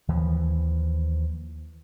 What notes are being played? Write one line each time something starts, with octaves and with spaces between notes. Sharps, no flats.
D#2 E3 F3